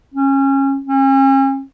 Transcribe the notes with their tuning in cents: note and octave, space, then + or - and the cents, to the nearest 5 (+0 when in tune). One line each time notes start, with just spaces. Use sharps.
C#4 -25
C#4 -40